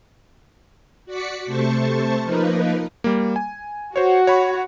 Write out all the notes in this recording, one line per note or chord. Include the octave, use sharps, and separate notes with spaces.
F#4 D5 B6 C#7
C3 A3 C5 A5 C#6
F3 A#3 D#4 A#4 B4
G3 A#3
G#5
F#4 C5 C#5
C#5 F#5 B5